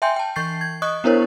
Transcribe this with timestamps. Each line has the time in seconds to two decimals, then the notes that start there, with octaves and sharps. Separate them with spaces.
0.02 E5 G5 G#5 C6 G6
0.16 G5 A5
0.36 E3 C#6 G6 A6 C7
0.61 G#6
0.82 D#5 C#6 D#6 F#6
1.04 B3 D4 E4 A#4 C5 C#5